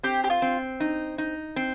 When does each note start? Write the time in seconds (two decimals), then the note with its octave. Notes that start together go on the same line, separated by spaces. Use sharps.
0.03 C4 G4
0.24 G4
0.30 F4
0.42 C4
0.80 D#4
1.18 D#4
1.56 C4